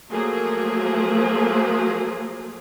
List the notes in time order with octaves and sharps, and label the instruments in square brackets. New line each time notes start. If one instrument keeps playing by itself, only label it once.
[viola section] F3 F#3 A3 A#3 G#4